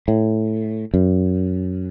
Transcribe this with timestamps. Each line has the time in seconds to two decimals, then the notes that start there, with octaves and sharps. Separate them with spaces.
0.08 A2
0.94 F#2